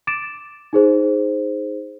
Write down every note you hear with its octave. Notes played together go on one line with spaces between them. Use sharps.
D6 A6 D7 E7
D#4 G#4 C5